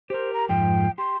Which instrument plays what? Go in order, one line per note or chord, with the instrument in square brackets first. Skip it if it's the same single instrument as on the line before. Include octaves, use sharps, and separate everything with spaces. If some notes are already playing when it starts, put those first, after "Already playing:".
[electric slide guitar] G4 A#4 [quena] C5
[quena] A#5
[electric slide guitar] F2 G#2 F3 [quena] G5
[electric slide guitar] G4 [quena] C6